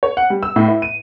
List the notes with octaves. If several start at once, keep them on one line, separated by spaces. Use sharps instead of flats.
C#5
F#5
G3
E6
A2
E4
D#7